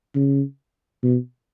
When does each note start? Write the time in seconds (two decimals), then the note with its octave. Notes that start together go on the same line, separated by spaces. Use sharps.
0.15 C#3
1.03 B2